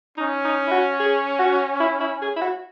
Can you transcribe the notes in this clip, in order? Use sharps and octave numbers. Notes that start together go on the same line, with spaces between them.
C#4 D#4
D#4
E4
F#4
G#4
F#4
E4
E4
G#4
E4
F#4